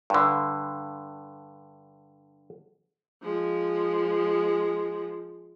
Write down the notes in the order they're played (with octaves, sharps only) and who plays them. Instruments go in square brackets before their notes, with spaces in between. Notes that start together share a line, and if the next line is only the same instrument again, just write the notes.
[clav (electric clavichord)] G2 D3
[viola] F3 G#3